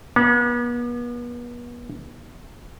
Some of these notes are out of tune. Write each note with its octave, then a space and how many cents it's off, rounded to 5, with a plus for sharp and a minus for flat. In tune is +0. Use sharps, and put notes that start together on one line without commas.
B3 -40